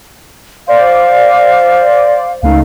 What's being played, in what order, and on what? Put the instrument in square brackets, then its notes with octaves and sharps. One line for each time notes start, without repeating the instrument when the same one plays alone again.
[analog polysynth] C5 D5 [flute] F5
[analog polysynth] C#2 A3 D#4 [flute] F5